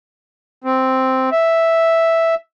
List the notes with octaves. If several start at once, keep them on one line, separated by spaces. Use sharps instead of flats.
C4
E5